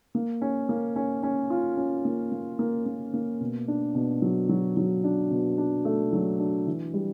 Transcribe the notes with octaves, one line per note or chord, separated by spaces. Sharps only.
A#3
C#4
A#3
C#4
C#4
F4
C#4
A#3
A#3
A#3
A#3
A#3
B2
D4
B2
F#3
F#3
F#3
D4
B2
D4
A3
F#3
D4
E3
G3